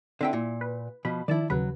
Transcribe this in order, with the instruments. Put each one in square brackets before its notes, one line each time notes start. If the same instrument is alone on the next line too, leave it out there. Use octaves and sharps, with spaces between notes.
[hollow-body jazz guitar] D3 C4 G5 [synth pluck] E4 E5 C6
[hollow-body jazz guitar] A#2
[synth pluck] B4
[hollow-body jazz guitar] B2 F3 [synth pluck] B5
[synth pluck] D#3 F3 A5 [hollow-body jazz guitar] E4 D5
[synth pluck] D#2 C#3 B4 [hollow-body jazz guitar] F#3